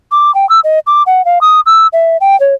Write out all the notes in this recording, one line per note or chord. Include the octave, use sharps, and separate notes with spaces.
D6
G5
E6
D#5
D6
F#5
F5
D#6
E6
E5
G5
C#5